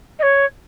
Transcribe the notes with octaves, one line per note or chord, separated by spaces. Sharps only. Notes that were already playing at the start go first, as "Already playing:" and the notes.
D#5
C#5